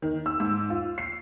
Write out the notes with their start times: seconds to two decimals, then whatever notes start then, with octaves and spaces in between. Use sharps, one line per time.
0.02 D#3
0.26 E6
0.40 G#2
0.70 F4
0.98 C7